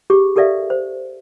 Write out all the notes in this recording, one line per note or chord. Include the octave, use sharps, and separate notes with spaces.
G4 G#4 C#6
G4 A4 A#4 D5 E5 F5
C5